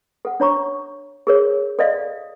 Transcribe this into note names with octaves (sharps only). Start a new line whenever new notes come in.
A4 F#5
D4 C#5 A#5 C#6
G#4 A#4 C#5
A4 D5 D#5 F5